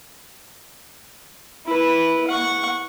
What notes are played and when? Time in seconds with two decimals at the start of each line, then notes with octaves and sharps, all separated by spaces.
1.66 E4 B4
2.27 F#5 C#6